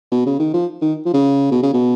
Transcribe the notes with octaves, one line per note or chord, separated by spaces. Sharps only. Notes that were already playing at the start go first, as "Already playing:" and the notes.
B2
C#3
D#3
F3
D#3
F3
C#3
B2
C#3
B2